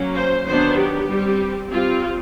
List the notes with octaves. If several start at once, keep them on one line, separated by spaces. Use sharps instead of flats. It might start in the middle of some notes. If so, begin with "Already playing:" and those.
Already playing: F#3 A#3 C#4
C5
D#3 F#3 B3 D4 C5
G4
G3 C4
G3 C4 F4